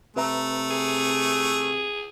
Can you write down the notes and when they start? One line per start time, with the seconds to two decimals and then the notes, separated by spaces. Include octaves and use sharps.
0.17 C3 A3 B4 E5 A#5
0.71 G#4